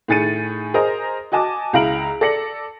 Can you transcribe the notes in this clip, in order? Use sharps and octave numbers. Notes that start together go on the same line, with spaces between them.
A2 D#3 G#4 A6 C#7 D#7
G#4 A#4 C5 D#5 A#5
F#4 D#5 G#5 A5 D6
C#2 E4 F5 A#5 D7 F#7
A4 D5 A#6 C#7 F#7